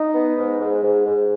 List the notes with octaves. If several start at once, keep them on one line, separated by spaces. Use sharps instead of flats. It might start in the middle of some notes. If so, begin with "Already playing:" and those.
Already playing: D#4
B3
G#2
G#2
G#2
G#2